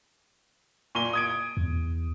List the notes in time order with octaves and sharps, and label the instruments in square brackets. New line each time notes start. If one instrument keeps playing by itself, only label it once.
[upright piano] A#2 D#7 G7
D#6 G#6 D7
[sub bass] E2